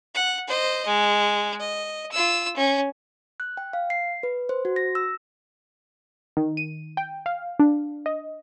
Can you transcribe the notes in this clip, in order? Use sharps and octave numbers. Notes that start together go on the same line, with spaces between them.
F#5
C5 D#5
G#3
D#5
F4 E6
C#4
F#6
G5
F5
C7
B4
C5
F#4
A#6
E6
D#3
D#7
G5
F5
D4
D#5